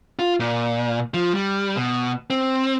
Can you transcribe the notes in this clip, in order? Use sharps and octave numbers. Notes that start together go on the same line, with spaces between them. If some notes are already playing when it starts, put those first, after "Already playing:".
F4
A#2
F3
G3
B2
C4